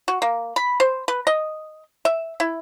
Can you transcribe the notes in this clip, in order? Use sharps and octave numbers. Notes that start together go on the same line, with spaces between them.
F#4
A#3
B5
C5
B4
D#5
E5
E4